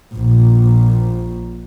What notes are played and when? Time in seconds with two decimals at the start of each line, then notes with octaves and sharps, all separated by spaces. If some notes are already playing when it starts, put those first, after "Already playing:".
0.14 A#1 A#2